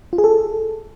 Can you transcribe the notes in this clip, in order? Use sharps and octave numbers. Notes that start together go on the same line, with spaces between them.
F4
G#4
A4